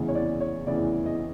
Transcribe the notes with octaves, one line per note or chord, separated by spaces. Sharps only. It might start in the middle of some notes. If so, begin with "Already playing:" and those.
Already playing: F1 E2 C#3 E3
C#5
D5
C#5
F1 E2 C#3 E3 D5
D#5